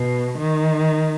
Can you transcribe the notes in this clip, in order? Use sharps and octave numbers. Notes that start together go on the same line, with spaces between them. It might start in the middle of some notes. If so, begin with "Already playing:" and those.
Already playing: B2
D#3